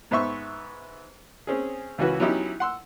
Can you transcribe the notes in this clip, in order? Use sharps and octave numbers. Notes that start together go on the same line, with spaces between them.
G#2 B3 C5 E5 C#6
C4 C#4 G#4
C#2 E3 C#4 F#4 B4
F#3 B3 C#4 D#4 E4 G4
F#5 C6 E6